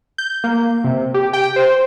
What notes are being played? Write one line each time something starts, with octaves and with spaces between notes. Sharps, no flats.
G6
A#3
C3
G4
G5
C5